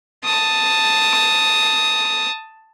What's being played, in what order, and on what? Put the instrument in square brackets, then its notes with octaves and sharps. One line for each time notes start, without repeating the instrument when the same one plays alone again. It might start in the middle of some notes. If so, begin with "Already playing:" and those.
[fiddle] A5 D#6